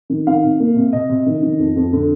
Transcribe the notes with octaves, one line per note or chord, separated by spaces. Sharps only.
D#3
D#3 F5
C3
A#3
C3
C3 D#5
C3
D#3
D#3
F2
F2
D3